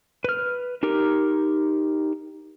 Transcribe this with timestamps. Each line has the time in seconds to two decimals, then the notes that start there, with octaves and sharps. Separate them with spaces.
0.24 B4 F6
0.83 D#4 G4 A#4